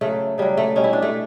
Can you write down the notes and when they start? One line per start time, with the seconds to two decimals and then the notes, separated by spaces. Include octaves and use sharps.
0.01 C#3 F#3 A3
0.38 C#3 F#3 G3
0.57 A3
0.75 B2 G3 C#4
0.84 E4
0.93 D4
1.02 A3